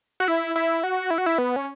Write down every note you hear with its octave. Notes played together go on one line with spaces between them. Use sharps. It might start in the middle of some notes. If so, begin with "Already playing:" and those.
F#4
E4
E4
F#4
E4
F#4
E4
B3
C#4